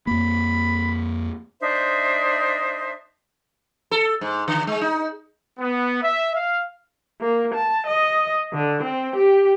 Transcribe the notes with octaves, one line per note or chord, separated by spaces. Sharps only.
F2 A#3 B5
D4 D#4 C5 E5
A4
G#2
D3
G#3
D#4
B3
E5
F5
A#3
A5
D#5
D3
C4
G4